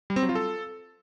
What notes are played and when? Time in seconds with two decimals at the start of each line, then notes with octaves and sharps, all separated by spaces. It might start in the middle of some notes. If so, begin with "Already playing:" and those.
0.10 G3
0.16 C4
0.23 F#3
0.29 F4
0.35 A4